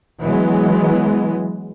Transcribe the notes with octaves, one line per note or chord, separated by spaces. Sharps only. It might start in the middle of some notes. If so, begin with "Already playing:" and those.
E3 F#3 G#3 B3